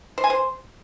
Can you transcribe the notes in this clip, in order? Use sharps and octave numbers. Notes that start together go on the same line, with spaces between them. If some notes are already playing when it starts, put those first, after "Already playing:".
C5
G#5
C5